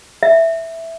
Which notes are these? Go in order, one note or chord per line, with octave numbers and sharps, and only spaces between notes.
E5